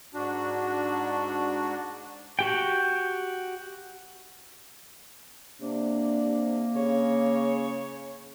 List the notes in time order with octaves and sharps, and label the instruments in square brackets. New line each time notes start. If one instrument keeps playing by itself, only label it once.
[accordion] G#2 D4 F#4
[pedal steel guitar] F#4 G4 G5
[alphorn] C3 [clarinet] A#3 [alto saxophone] D4
[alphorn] C3
[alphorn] C#3 [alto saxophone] C#5